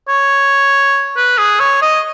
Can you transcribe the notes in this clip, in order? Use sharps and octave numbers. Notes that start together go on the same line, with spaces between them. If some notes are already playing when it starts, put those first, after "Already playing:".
C#5
B4
G#4
C#5
D#5